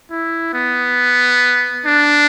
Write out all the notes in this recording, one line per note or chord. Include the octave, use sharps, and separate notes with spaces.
E4
B3
D4